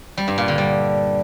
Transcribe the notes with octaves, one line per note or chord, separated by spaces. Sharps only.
G3
G2
A#2
D3
G3